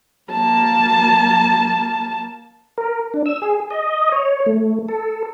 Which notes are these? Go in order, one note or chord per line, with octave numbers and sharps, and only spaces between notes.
A#3 A5
A#4
D4
E6
G#4
D#5
C#5
A3
A4